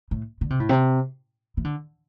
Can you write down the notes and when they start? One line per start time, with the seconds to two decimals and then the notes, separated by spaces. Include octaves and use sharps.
0.11 A2
0.41 D3
0.50 C3
0.60 A2
0.69 C3
1.57 E3
1.64 D3